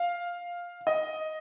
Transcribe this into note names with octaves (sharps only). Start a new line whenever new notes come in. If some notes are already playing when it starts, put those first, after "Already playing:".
Already playing: F5
D#5